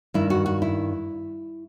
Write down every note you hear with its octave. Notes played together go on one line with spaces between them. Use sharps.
G2 D#3 E4
F#4
F#4
E4